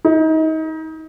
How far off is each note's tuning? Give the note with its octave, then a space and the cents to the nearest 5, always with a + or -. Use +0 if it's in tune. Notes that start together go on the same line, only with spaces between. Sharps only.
D#4 +30